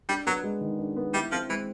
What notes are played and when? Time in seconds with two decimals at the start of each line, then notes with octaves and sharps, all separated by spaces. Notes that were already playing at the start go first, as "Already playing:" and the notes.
0.09 G3 D4
0.26 F#3 B3
0.44 G#3
0.61 D#3
0.79 D4
0.97 B3
1.14 G3 E4
1.32 F3 C4
1.49 E3 G#3